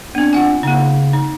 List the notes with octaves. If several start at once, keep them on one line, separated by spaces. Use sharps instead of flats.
B3 C4 D4
F4 F#5 G#5
C#3 A#3 D#4
D#4